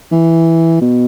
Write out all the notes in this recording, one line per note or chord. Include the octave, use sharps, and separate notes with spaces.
E3
B2